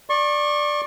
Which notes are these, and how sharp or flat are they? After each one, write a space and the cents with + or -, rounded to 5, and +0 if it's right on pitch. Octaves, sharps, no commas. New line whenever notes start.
D5 +5 C#6 -30